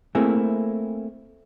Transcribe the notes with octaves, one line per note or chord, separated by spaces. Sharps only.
A3 A#3 C4 E4 G#4